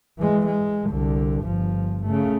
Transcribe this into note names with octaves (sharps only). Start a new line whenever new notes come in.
E3 G#3
G#3
C2 D3
G1 F3
C#3 A3